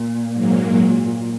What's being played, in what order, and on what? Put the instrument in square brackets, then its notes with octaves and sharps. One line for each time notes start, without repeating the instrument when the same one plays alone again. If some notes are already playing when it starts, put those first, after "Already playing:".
Already playing: [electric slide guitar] A#2
[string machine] G#2 F#3 A#3